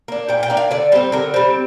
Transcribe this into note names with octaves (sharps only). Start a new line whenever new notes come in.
A#3 D4
A#2 G5
G5
A#3 D4
F5
D3 D5
G3 C4 C5
D3 A#4
G3 C4